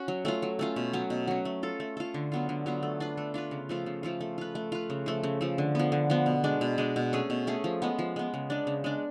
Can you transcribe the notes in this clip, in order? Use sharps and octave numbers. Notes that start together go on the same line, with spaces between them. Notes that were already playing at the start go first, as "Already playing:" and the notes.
Already playing: C#4 F#4
F#3
A3 C#4 F4
F#3
A3 C#4 F4
B2
F#3 C#4
B2
F#3 C#4
A3
F4 A4
A3
F4 A4
D3
F#3 B3 F4
D3
F#3 B3 F4
A3
D4 F4 B4
A3
D4 F4 B4
C#3
F3 A3 F4
C#3
F3 A3 F4
A3
F4 B4
A3
F4 B4
C#3
F3 A3
C#3
F3 A3
D3
F3 B3
D3
F3 B3
B2
G#3 D4
B2
G#3 D4
B2
A3 C#4 G#4
B2
A3 C#4 G#4
F3
G#3 B3
F3
G#3 B3
C#3
G#3 D4
C#3
G#3 D4